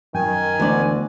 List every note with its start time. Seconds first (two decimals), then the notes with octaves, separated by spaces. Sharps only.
0.15 F#2 D#3 G5 G#5
0.60 D2 E3 B3 D4 D5